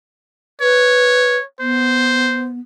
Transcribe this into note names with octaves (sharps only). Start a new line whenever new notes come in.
B4 C#5
B3 C5